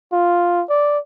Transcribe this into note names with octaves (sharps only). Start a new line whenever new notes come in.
F4
D5